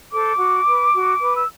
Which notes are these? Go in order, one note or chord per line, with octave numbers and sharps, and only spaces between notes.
A4 C5 D6
F#4
B4
F#4
B4
E6